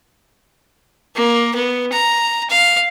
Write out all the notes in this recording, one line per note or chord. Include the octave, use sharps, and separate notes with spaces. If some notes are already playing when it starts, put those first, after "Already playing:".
A#3
B3
A#5
F5